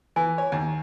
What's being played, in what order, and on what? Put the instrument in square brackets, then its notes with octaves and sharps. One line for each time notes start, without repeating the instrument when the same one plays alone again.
[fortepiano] E3 [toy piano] G#5
[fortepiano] C#5
D#2